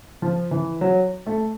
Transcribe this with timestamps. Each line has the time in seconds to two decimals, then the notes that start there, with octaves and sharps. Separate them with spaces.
0.22 F3
0.51 E3
0.81 F#3
1.27 A3